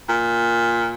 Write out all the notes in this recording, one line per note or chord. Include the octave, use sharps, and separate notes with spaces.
A#2